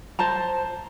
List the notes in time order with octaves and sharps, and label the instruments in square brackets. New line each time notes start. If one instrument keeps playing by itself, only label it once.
[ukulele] C5 A5 A#5